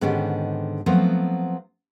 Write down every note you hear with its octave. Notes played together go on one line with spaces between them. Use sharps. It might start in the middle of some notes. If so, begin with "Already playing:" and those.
G#2 D3 D#3 B3 C#4 G4
F3 F#3 A3 B3 C4